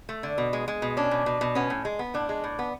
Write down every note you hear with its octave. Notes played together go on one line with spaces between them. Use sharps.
A3
D3
B2
G#3
G#3
B2
C#4 D4
B2
B2
B2
B3 C#4
A2
G#3
B3
A2 D4
G#3
A2
B3